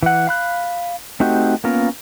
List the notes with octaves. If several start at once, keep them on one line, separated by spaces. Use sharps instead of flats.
E3 F#5
F5 B5 F#6
A3 C4 D#4 F#4 G4
A#3 B3 C#4 F4 A#4